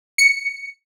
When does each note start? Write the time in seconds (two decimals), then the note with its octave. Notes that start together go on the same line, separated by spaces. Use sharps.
0.18 C#7